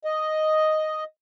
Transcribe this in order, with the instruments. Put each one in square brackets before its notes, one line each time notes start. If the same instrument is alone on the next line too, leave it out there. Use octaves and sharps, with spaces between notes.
[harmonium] D#5